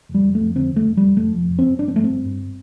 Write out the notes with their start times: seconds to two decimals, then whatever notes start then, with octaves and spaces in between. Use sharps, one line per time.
0.09 F1
0.14 G3
0.24 F1
0.35 A3
0.40 F2
0.55 D3 C4
0.71 F1 A3
0.86 F1
0.97 G3
1.02 F1
1.17 F1 A3
1.33 F2
1.49 F1
1.59 C4
1.64 F1
1.79 G1 D4
1.88 C4
1.94 G2 A3
2.04 C4
2.10 G1
2.25 G2